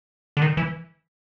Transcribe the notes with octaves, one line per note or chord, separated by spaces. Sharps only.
D3
D#3
E3